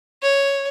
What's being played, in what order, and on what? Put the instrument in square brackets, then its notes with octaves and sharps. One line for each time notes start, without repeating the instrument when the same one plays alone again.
[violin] C#5